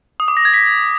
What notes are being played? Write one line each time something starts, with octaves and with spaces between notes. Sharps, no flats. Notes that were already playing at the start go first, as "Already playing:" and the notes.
D#6
D6
A#6
G#6
B6